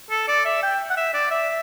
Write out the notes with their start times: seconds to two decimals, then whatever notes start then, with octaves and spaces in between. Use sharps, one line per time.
0.11 A4
0.28 D5
0.45 E5
0.63 G5
0.90 F#5
0.97 E5
1.14 D5
1.31 E5